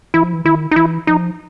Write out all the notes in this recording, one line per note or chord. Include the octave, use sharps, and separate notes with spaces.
E3 E4
F3
E3
D#3 E4
D#4
E3 E4
F3 D#4